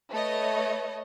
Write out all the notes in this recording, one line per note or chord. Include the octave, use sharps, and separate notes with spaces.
A3 B4 C#5 D#5